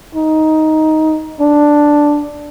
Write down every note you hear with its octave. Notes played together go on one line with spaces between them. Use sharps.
D#4
D4